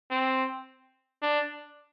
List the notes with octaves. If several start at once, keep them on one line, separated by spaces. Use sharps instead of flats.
C4
D4